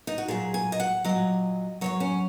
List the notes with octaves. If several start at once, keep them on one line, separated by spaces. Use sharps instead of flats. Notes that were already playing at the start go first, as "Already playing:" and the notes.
D#4
F#4
A#2 F#3 G#4
G#5
D#5
F#5
A#2 F#3 D#5
F#2 C#3 F#3 C#5
C#4